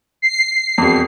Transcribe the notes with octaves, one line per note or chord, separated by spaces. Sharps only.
C7
E1 F2